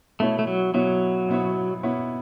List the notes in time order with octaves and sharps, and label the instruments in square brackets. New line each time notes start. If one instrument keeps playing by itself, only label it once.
[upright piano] B2 B3 E4 C#5 [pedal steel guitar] A3
[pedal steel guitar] A3
F#3
[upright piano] B2 B3 E4 C#5 [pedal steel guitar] F#3
[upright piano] B2 B3 E4 C#5
B2 B3 E4 C#5